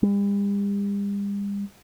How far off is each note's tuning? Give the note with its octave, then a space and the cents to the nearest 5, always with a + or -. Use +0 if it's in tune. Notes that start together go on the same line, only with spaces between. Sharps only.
G3 +45